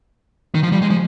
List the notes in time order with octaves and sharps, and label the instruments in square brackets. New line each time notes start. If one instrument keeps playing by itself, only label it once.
[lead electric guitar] D#3
F3
G3
G#3
F3